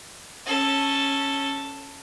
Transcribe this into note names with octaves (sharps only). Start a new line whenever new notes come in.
C#4 A4